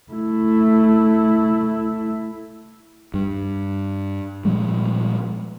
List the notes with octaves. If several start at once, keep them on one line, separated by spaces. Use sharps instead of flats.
A3 E4
G2
A#2 F3 G3 G#3